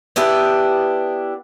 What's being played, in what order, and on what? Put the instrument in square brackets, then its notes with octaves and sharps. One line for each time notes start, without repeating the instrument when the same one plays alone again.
[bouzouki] B3 D4 E4 G4